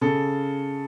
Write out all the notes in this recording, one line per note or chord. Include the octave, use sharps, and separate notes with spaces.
C#3 A4